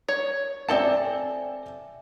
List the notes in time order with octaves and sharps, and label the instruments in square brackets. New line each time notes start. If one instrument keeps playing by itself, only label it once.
[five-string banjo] C#5
[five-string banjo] C4 A4 A5 [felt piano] D5 E5 G#5